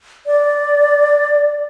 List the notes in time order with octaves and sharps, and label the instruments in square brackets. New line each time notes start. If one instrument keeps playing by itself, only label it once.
[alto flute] D5